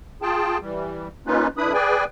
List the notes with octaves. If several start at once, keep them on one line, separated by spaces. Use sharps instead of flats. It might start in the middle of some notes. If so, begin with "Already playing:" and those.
F4 G#4 G5 A5
E3 G3
A#3 C#4 D#4 F4 B4
F2 D4 E4 B4 B5 D#6
G#4 B4 D5 G5 G#5